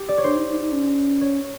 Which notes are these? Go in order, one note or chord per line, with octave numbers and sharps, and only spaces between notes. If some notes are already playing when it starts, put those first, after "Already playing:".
Already playing: G4
D5
C#5
D4 C5
D#4
D#4
D#4
C#4
C#5